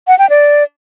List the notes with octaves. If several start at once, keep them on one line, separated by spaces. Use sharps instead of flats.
F#5
G5
D5